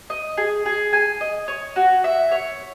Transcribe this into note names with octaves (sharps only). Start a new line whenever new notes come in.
D#5
G#4
G#4
G#5
D#5
C#5
F#4
E5
C#5